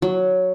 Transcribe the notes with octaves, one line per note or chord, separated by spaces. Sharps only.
F#3